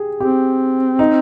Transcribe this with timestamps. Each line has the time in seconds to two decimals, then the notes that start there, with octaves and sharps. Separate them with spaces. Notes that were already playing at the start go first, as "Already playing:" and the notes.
Already playing: G4 G#4
0.20 C4 G4
0.99 D#4